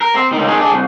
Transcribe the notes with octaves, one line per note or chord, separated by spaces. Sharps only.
A#4
C4
C#2 D#3
D#3 G#3
D4 G#4
C2